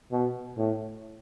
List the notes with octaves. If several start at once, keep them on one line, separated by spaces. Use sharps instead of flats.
B2
A2